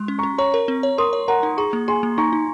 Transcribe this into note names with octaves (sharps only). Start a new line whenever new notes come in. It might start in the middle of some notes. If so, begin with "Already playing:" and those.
Already playing: G#3 C6
C#4
C#4 A#5 C#6
C#5 A#5 C#6
A#4
C4
C#5
A#4 C6 D#6
C#5
A#4 F#5 A#5
D#4
G#4 A#5 C#6
A#3
G#4 G#5 C6
A#3
D#4 A#5 C#6
D#4